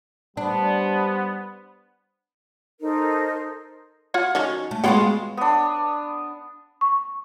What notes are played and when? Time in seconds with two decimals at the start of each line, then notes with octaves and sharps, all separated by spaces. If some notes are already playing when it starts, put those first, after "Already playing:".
0.37 G3 B3 D4 C5
2.82 D#4 A4 A#4 C5
4.14 F4 C#5 F#5
4.35 D#3 F#3 C#4
4.71 A3
4.84 G#3 B3 F4 F#4 C#5 G5
5.37 B3 D4
6.81 C#6